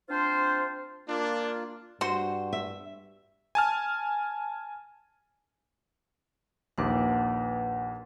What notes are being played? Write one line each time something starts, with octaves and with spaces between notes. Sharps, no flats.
C4 D4 F4 C5
A#3 D4 F4
G2 F#4 C5 C6
E5
G#5 A5 F6
A#1 D#2 B4 F#5 D6